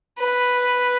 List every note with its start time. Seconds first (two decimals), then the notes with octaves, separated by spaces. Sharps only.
0.19 B4